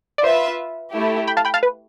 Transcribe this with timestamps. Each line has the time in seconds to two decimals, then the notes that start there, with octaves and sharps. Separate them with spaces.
0.18 D5
0.23 F4 B4 C5 E5
0.93 A3 E4 G4
1.27 G5 B5
1.37 F5 A5
1.45 G5 B5
1.54 F5 A5
1.63 B4